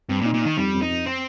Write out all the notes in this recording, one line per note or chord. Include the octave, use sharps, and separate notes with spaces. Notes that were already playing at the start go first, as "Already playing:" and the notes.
G2 C4
A#2
D#4
A#2
D#3 D#4
F2 G3
F2
D#4
F2
C4